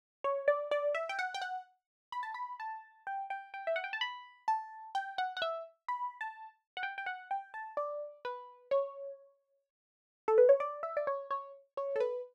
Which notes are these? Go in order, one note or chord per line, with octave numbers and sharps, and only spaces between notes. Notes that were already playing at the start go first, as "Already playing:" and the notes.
C#5
D5
D5
E5
G5
F#5
G5
F#5
B5
A5
B5
A5
G5
G5
G5
E5
F#5
G5
A5
B5
A5
G5
F#5
F#5
E5
B5
A5
F#5
G5
G5
F#5
G5
A5
D5
B4
C#5
A4
B4
C#5
D5
E5
D5
C#5
C#5
C#5
A4
B4